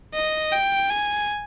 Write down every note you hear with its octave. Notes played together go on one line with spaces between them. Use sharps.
D#5
G5
G#5